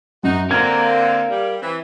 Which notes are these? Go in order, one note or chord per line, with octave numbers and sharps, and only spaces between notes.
F#2 D#4 F#4
D3 C4 A#4 F5 G#6
G3
E3 C4